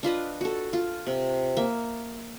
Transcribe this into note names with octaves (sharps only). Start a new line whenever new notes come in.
D4 F4 B4 D#5
F#4 A4
F4
C3
A#3 E5